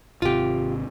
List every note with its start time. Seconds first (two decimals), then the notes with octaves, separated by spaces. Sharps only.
0.22 G#1 C3 F4 G4